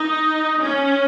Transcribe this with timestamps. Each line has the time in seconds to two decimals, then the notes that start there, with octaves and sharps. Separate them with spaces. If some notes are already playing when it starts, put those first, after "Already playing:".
Already playing: D#4
0.60 C#4